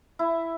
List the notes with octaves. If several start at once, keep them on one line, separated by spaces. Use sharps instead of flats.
E4